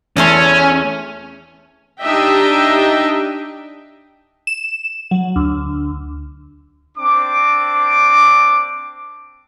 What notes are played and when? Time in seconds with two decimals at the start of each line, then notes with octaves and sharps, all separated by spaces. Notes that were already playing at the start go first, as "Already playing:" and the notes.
0.17 E2 A3 C#4 C6
2.01 D4 D#4 G4 D#5 E5 G5
4.47 E7
5.11 F#3
5.36 D2
6.98 C4 D4 D6